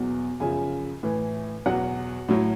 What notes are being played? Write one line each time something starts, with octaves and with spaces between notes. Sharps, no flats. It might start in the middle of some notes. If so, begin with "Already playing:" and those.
Already playing: E2 B2 F#3
F#2 C#3 F3 G#5
A2 E3
E2 B2 F#3 F#5
A2 F#3